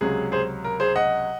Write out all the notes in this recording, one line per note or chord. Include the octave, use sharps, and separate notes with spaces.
C#2 C3 F#3 G#4
G#4 C5
A#4
G#4 C5
D#5 F#5